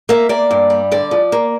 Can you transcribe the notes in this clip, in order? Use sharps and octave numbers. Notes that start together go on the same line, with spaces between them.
A#3 E5
A#3 D5
G2
G3
D3 D5
F3
A#3